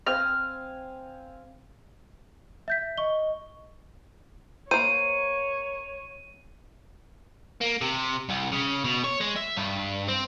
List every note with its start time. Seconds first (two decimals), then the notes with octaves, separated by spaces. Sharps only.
0.07 C4 F5 G#5 F6
2.68 E5 G6 B6
2.98 D#5 C#6 G7
4.71 A#3 C5 C#5 D#7
7.61 A#3
7.81 C3
8.30 C2
8.52 C#3
8.84 B2
9.04 C#5
9.21 G#3
9.36 E5
9.57 G2
10.08 C4